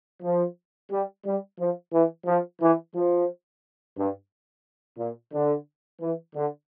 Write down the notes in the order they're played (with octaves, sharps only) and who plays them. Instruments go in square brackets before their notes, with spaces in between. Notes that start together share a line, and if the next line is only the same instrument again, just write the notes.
[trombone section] F3
G3
G3
F3
E3
F3
E3
F3
G2
A#2
D3
E3
D3